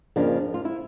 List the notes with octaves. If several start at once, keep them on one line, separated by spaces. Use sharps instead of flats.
F2 C#3 F3 A#3 D4
F4
E4